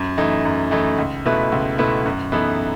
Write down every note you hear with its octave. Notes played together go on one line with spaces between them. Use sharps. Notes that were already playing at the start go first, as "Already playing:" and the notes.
Already playing: F#2
E3 A3 D#4
F#2
E3 A3 D#4
C#2
B2 A3 E4 B4
C#2
B2 A3 E4 B4
F#2
E3 B3 D#4 A4